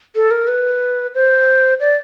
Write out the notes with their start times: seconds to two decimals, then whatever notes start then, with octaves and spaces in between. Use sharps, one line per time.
0.15 A4
0.31 A#4
0.48 B4
1.15 C5
1.80 D5